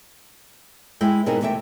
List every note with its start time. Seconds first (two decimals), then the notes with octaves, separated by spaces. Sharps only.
1.01 G#3 E4 G5
1.26 B2 B3 C4 D#4 G#4 A#4
1.41 E2 C3 A3 E5 G5